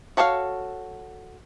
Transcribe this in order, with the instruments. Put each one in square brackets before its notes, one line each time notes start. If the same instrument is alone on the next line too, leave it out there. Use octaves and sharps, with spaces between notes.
[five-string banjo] F#4 A4 C#5 D#5 F5